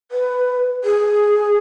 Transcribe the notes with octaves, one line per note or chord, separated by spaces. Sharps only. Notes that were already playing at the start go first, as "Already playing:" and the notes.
B4
G#4